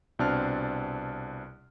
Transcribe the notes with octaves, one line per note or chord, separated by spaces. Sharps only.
C2 B2 C4 D4 A5 F6